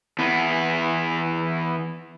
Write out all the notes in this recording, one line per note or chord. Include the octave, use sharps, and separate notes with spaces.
E2 B3